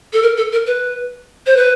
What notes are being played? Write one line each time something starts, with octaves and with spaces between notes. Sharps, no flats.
A4
A#4
A4
A#4
B4
C5
B4